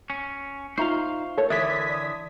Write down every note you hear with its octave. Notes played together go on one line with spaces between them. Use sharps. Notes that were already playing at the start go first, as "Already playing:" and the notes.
C#4
D#4 F4 C5 E5 F5 A#5 C#6
A3 A4 A#4 C#5
D3 E3 D4 E5 D#6 G#6 B6
D5